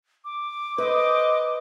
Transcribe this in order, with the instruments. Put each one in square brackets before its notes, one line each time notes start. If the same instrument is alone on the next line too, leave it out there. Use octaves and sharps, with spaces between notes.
[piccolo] D6
[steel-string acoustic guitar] B4 [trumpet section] C5 D#5